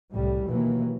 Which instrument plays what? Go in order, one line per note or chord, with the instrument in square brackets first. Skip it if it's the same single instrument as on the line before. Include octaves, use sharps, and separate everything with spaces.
[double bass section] C2 A2 G3
D#2 B2 E3 F#3 A#3